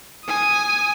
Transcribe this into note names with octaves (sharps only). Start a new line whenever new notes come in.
G#5 D#6